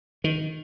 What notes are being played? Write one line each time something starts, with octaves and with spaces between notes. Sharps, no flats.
D#3